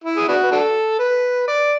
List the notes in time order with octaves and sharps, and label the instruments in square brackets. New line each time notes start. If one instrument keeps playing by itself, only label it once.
[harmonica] E4
G#4
B3 D4 F#4
B4
D4 F#4 A4
B4
D5